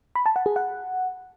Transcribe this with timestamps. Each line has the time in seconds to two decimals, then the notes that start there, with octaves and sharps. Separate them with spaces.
0.15 B5
0.26 A5
0.36 F#5
0.46 G#4
0.56 F#5